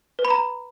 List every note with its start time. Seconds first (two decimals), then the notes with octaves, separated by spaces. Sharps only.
0.19 B4
0.25 B5
0.30 A#5